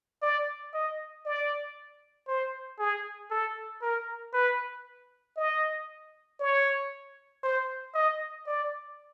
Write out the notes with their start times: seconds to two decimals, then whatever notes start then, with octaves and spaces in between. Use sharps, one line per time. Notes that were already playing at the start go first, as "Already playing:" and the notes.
0.22 D5
0.74 D#5
1.25 D5
2.28 C5
2.79 G#4
3.31 A4
3.82 A#4
4.33 B4
5.37 D#5
6.40 C#5
7.43 C5
7.94 D#5
8.47 D5